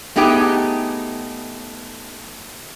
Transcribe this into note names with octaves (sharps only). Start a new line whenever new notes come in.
A3 B3 D#4 G4 G#4 G5